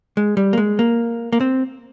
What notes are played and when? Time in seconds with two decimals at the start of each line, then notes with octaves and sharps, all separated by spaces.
0.17 G#3
0.37 G3
0.53 A#3
0.58 G#3
0.79 A#3
1.33 A#3
1.41 C4